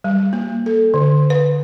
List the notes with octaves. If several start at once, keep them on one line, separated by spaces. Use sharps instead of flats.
G3
A#3
A4
D3
B4